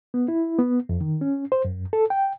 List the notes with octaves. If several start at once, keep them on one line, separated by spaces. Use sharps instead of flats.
B3
E4
B3
F2
D#3
C#4
C5
F#2
A4
G5